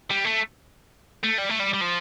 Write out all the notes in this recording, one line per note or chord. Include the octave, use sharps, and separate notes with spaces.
G3
A3
A3
G3
A3
G3
G3
F3